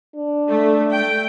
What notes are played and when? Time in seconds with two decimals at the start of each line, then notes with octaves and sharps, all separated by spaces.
0.15 D4
0.48 A3
0.92 A3 G5